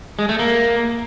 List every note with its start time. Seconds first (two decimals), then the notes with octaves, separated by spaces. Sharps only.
0.19 G#3
0.29 A3
0.39 A#3